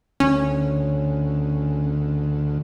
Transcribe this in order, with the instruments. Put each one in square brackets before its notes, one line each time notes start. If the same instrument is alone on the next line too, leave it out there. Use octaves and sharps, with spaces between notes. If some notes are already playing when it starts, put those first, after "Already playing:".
[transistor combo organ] D2 [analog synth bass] C#4